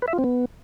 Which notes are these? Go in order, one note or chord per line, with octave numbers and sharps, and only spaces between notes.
B4
E5
F4
C4
B3